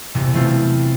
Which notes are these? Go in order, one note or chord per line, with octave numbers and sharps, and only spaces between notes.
E1 C3
E3 A3 C4 F4